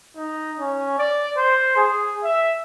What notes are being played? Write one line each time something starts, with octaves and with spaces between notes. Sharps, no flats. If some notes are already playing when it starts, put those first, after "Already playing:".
D#4
C#4
D5
C5
G#4
E5